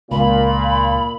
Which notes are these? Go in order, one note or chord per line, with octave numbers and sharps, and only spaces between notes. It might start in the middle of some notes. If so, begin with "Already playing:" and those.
C#2 A#2 F5 B5